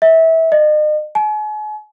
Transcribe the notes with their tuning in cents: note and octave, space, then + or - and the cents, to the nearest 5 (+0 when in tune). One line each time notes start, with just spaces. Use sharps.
E5 -25
D#5 -40
G#5 +40